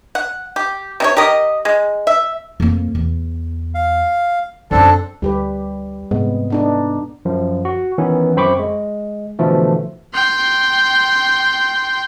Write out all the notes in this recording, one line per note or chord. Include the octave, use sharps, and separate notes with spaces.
F#5
G4
C3 D#4 C#5
G4 A#4 D#5
G#3
E5
F2 A#3
E2
F5
F#2 D3 C4 D4 A4
D2 G3 G4 B4
G#2 C3 G#3 B3
B3 D4 D#4
F#2 F3
F#4
D#3 E3 B3 C#4
F#2 C4 C5 B5 C#6 D6
G#3
B2 D3 E3 F3 A3
G5 C6